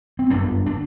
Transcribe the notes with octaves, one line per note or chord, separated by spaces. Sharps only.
C4
G1 F#2 D3 B3 D4
D4